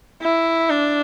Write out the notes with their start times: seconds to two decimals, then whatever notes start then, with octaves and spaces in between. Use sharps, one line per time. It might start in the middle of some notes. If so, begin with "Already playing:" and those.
0.22 E4
0.70 D4